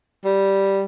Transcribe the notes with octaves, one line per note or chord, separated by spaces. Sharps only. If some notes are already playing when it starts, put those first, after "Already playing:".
G3